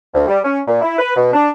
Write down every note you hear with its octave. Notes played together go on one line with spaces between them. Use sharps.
D2
G3
C#4
A#2
E4
B4
B2
D4